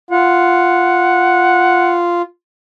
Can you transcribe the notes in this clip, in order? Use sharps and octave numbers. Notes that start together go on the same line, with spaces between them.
F4 F#5